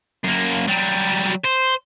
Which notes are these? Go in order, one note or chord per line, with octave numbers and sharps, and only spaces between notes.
F#2 A#3
F#3 G3
C5